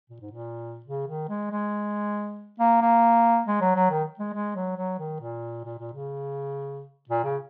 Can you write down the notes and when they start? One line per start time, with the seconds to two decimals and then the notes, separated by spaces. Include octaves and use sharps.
0.10 A#2
0.21 G#2
0.32 A#2
0.86 C#3
1.08 D#3
1.29 G#3
1.51 G#3
2.60 A#3
2.82 A#3
3.47 G#3
3.61 F#3
3.76 F#3
3.90 D#3
4.19 G#3
4.33 G#3
4.56 F#3
4.77 F#3
4.99 D#3
5.21 A#2
5.64 A#2
5.79 A#2
5.93 C#3
7.09 A#2
7.24 C#3